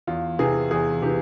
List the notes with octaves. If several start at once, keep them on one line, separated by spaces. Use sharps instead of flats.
E2 F4
C3 E3 G#4
E2 G#4
C3 E3 G4